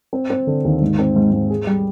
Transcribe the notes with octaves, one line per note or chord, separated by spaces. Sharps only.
C4
C4
D3
D#2
G#2
C4
G#2
G#2
G#4
G3